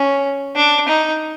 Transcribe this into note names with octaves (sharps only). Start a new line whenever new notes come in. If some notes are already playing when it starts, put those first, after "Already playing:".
Already playing: C#4
D4
D#4